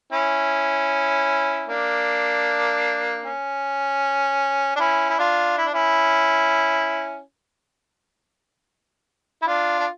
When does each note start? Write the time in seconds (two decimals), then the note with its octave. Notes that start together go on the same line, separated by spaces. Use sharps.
0.12 C#4 E4
1.68 A#3 D4
3.24 C#4
4.76 D4
4.80 C#4 E4
5.10 E4
5.18 D4 F4
5.58 E4
5.66 D4
5.74 C#4 E4
9.42 E4
9.47 D4 F4
9.80 D4